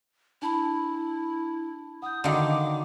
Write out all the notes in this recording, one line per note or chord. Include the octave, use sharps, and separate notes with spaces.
D4 E4 A5 B5
F#5 D#6 G6
D3 D#3 F#4 F5 D6